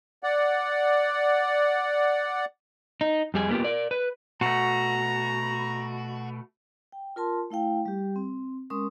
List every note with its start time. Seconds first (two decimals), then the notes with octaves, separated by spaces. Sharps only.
0.23 D5 F#5
3.01 D#4
3.34 F2 G3 G#4
3.49 A#3 B3 E4 F4 G4
3.64 A#4 D5
3.91 B4
4.41 B2 A3 F#4 A#5
6.92 G5
7.16 F4 A#4 A5 C6
7.50 A3 E4 F5 G5
7.85 G3 G4
8.16 C4
8.70 G#3 C#4 A#4 C6 D#6